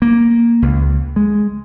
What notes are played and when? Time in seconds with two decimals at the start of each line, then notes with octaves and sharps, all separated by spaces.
0.02 A#3
0.62 C#2
1.16 G#3